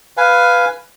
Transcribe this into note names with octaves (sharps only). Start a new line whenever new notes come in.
B4 F5 G#5